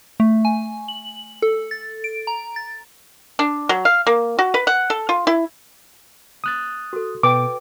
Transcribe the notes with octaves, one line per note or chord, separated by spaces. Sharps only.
A3
G#5
F#7
A4
A6
D7
A#5
A6
D4
F#3
F5
A#3
F#4
B4
F#5
A4
F4
E4
D#6 F#6 A6
F#4 A4
B2 B4 G5 D6